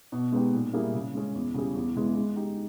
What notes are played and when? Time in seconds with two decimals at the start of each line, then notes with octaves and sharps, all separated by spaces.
0.12 B2
0.32 G#3 B3 D#4 G4
0.53 A#2
0.73 G3 A#3 E4 G#4
0.94 C#3
1.15 G#3 C#4 G#4
1.34 E2
1.54 C#3 G3 C#4 G#4
1.75 E2
1.96 C#3 G#3 B3 E4
2.15 G#3
2.36 D#4 G4